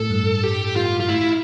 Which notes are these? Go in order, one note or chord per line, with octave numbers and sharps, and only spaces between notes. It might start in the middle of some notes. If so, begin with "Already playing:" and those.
Already playing: A2 A4
G2
G4
F4
F4
A2 E4